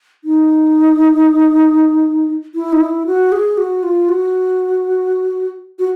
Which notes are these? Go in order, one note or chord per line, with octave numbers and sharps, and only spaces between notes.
D#4
E4
D#4
E4
F#4
G#4
F#4
F4
F#4
F#4